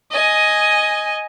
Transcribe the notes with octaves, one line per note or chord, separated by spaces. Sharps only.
D#5 G#5